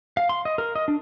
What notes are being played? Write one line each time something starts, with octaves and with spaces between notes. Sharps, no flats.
F5
C6
D#5
A#4
D#5
D4